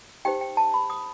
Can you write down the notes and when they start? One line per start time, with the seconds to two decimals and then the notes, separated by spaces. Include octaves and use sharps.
0.25 D#4 G4 C5 G5
0.41 G5
0.57 A5
0.74 B5
0.90 D#6